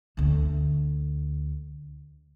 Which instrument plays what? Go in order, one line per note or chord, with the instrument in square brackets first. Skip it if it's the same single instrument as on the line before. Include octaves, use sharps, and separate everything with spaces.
[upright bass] D2 D3